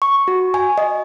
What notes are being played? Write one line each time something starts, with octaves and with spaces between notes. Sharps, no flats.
C#6
F#4
G#5
D#5